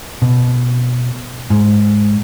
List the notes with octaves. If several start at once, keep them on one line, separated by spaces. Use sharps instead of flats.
B2
G#2